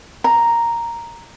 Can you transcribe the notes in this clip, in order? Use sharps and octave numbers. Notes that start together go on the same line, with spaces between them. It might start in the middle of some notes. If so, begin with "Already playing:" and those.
A#5